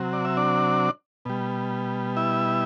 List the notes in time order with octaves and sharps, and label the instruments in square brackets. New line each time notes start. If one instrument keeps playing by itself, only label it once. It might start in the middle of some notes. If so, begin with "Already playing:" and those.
Already playing: [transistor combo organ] C3 F#3
D5
E5
D4 D5
B2 G3
E4 E5